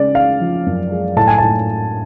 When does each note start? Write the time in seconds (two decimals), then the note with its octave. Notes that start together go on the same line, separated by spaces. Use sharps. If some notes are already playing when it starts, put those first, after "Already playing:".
Already playing: C#3 G#3 D5
0.15 G#3 F5
0.40 F3
0.66 F#2
0.92 G#3
1.17 A2 A5
1.27 G#5
1.38 A2 A5